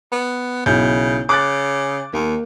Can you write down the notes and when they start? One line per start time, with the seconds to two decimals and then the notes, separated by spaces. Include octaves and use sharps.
0.12 B3
0.66 B1 C#3 E4 G6
1.29 C#3 D6 F#6 A6
2.13 D#2 A#3